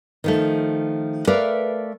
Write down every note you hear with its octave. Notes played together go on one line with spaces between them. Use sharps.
D#3 F3 A3
A3 A#4 B4 D5 E5 F5